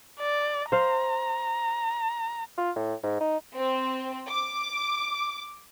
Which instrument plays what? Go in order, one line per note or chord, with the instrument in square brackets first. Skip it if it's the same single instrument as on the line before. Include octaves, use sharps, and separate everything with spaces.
[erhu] D5
[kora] C5 F5 [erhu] A#5
[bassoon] F4
A2
G#2
D#4
[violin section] C4
D6